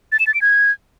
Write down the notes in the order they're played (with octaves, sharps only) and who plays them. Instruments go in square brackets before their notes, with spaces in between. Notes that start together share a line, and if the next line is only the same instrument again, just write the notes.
[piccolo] A6
E7
A6
D7
G#6